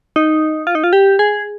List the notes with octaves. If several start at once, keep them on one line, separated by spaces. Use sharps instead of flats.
D#4
F4
D#4
F4
G4
G#4